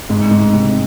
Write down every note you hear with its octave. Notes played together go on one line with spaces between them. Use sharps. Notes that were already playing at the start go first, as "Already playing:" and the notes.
G#2 G#3
G#2 G#3
C3 C4